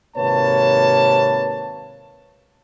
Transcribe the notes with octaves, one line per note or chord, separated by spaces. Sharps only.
G#1 C3 A#3 B4 C#5 A5